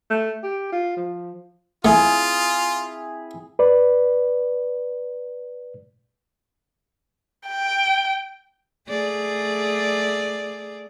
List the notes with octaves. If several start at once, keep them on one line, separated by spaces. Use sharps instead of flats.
A3
G4
F4
F3
A3 C4 E4 F4 G#4
B4 D5
G5
A3 G#4 D5